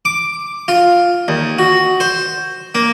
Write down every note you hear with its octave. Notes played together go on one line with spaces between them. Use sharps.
D6
F4
D#2
F#4
C5
A#3